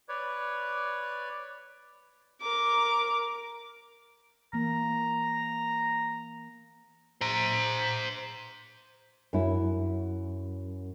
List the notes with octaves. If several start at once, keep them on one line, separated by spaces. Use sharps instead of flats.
B4 C#5 D5
A#4 D6
E3 A#3 A#5
C5 A#5
F#2 E4